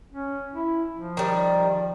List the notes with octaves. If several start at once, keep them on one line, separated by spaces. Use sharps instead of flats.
C#4
E4
F3
D#3 G3